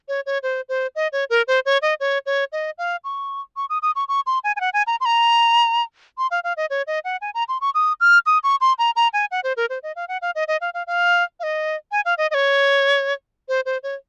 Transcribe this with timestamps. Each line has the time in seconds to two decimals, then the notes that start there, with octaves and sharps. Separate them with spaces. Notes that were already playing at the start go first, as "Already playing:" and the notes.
0.08 C#5
0.26 C#5
0.43 C5
0.69 C5
0.95 D#5
1.12 C#5
1.30 A#4
1.48 C5
1.66 C#5
1.82 D#5
2.00 C#5
2.26 C#5
2.52 D#5
2.78 F5
3.04 C#6
3.57 C#6
3.70 D#6
3.82 D#6
3.96 C#6
4.08 C#6
4.27 C6
4.44 G#5
4.56 G#5
4.60 F#5
4.74 G#5
4.87 A#5
5.01 C6
5.05 A#5
6.18 C6
6.31 F5
6.44 F5
6.57 D#5
6.70 C#5
6.87 D#5
7.04 F#5
7.21 G#5
7.34 A#5
7.49 C6
7.61 C#6
7.75 D#6
8.00 F6
8.26 D#6
8.44 C#6
8.61 C6
8.79 A#5
8.96 A#5
9.13 G#5
9.31 F#5
9.44 C5
9.57 A#4
9.70 C5
9.83 D#5
9.96 F5
10.08 F#5
10.22 F5
10.35 D#5
10.48 D#5
10.61 F5
10.74 F5
10.87 F5
11.40 F5
11.43 D#5
11.92 G#5
12.05 F5
12.18 D#5
12.31 D#5
12.34 C#5
13.48 C5
13.66 C5
13.83 C#5